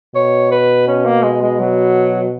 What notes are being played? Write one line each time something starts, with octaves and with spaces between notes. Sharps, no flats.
B2 C#5
B4
C#4
A#3
G#3
G#3
F#3